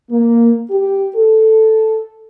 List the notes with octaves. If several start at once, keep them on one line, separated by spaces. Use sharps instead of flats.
A#3
G4
A4